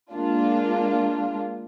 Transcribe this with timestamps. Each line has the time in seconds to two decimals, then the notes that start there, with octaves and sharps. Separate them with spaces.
0.13 G#3 A#3 D4 F4